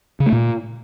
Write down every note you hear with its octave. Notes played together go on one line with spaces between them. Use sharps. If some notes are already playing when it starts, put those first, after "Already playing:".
C#3
A3
A#2